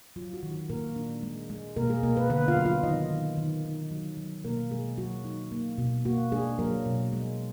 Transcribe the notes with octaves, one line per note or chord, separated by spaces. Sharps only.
F#3 F4
F#4
D#3
F#4
A#2 A#3 A#4
D4
G#3
G#3
B2 A#3 A#4
G#3 G#4
B2 A#3 A#4
B3 B4
D3 B3 B4
F4 F5
F#3
F4 F5
D#3 D#4 D#5
D#3
D#3
D#4
F#3
F#3
B2 A#3 A#4
B2 G#3 G#4
F#3 F#4
D#4
A#3
B2
A#3 F#4
G#3 D4 G#4
F#3 A#3 A#4
B2
G#3